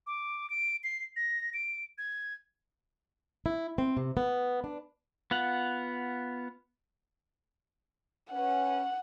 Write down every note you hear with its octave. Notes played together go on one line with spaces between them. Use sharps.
D6
D7
C7
A#6
D7
G#6
E4
C4
C3
B3
D4
B3 F4 F5 F#5
C#4 B4 F#5